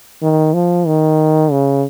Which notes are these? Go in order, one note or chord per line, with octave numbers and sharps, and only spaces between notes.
D#3
F3
D#3
C#3